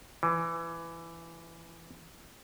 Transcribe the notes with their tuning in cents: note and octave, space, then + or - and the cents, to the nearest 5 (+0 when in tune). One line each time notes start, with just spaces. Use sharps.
E3 +15